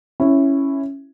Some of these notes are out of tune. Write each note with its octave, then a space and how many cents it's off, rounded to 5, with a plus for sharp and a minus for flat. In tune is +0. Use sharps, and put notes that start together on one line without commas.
C#4 -5 E4 +0